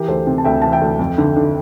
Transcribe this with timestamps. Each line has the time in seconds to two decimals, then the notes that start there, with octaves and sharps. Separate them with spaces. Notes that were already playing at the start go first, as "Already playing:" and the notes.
Already playing: E3 G4 A#4
0.08 D2 A4 C5
0.27 C3
0.38 A5
0.44 D2 E5 G5
0.62 E3 A5
0.72 E5 G5
0.81 D2
0.99 F2
1.18 D3
1.36 D3